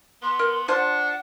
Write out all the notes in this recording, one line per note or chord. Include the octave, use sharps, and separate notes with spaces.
B3 C6
A#4
D4 F4 C5 F#5 A5